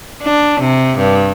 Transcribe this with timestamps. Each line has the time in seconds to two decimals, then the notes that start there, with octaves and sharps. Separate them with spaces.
0.23 D4
0.61 C3
0.99 G2